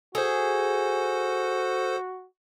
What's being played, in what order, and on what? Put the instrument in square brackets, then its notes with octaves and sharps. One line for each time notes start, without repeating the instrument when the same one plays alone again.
[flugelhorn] F#4 [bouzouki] G#4 [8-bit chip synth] A4 C5